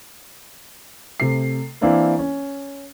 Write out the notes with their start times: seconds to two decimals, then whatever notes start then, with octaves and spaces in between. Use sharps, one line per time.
1.20 C3 A3 C7
1.81 E3 A#3 C4 D4 E4 A#4
2.19 C#4